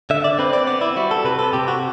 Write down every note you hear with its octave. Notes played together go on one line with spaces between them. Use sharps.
D3 E5
D5
C4 B4
D5
B3 D5
E4
G3 F#4
A4
C3 B4
A4
C3 G4
F#4